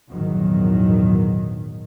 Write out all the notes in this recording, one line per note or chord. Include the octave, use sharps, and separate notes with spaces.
A#1 E2 G#2 D#3 F#3